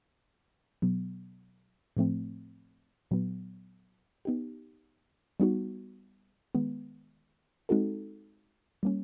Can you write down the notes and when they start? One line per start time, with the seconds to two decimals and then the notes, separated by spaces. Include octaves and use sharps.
0.82 B2 F#3 B3
1.97 A2 F3 A3 C4
3.11 A#2 F#3 B3
4.25 B3 D#4 G4
5.40 G3 B3 D#4 F#4
6.55 D#3 G#3 B3
7.69 G#3 C4 D#4 F#4 A4
8.83 G3 A#3 C#4